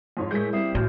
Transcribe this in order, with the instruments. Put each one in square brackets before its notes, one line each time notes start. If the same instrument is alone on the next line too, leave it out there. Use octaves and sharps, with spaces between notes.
[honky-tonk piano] F2 G#2 C#5
[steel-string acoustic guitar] A2 G#3 A3 [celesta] G#4 A#4 [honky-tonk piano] G6 B6
[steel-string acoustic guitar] G3 A#3 C4 [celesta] E5 D#6 C7
[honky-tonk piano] A1 [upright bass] A2 [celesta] F#4 F6 G6